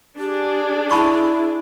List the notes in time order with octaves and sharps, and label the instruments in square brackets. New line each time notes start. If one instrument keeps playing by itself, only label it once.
[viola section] D4 G#4 [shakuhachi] G4
[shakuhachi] E4 [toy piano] A5 B5 C#6